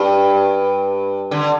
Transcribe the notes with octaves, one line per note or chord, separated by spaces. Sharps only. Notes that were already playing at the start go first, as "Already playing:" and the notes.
Already playing: G2
D3